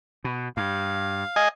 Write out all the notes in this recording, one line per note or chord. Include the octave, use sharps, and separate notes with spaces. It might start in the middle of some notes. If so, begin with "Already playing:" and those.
B2
G2 F5
D#5 G#5